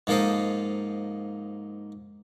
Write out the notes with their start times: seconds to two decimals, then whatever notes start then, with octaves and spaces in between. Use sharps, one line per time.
0.07 G#2 F3 A#3 A4 C5 D#5